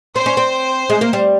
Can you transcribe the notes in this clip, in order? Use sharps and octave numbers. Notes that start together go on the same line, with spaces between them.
C4 C5
C#4
C4
G#3
A#3
G3